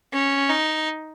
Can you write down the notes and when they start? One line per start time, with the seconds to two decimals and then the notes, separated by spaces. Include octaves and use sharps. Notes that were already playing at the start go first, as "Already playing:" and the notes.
0.13 C#4
0.49 D#4